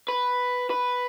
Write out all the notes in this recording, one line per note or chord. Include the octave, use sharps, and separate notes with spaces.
B4
B4